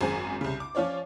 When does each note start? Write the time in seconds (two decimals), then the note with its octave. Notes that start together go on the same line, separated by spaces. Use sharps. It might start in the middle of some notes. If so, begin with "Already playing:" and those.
0.01 G#1 F#2 G#4 C5 G#5
0.41 C2 C#3
0.60 D6
0.75 F3 C#4 F4 C#5 D5